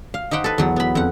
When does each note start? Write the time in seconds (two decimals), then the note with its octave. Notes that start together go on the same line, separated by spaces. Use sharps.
0.14 F5
0.31 D#4 G4 C5 F#5 G5
0.44 A4 B4
0.58 E2 F#3
0.76 B3 B5
0.95 F2 F#5